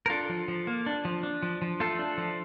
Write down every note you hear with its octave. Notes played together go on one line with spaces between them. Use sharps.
A#4
D4 F4 A4
F3
F3
A#3
D4
F3
D4
F3
F3
A3 F4 A4
D4
F3